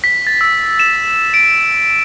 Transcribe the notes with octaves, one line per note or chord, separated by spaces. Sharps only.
B6
A6
E6
E7
D7